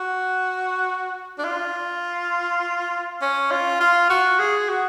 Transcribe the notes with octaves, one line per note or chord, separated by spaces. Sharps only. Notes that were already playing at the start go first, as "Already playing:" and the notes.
Already playing: F#4
D4
F4
C#4
F4
F4
F#4
G#4
F#4